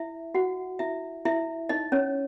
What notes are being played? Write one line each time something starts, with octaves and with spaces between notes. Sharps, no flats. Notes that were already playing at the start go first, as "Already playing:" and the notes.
Already playing: E4 E5
F#4 F#5
E4 E5
E4 E5
D#4 D#5
C#4 C#5